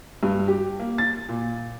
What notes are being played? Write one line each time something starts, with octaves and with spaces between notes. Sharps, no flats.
G2
G4
A#3
A6
A#2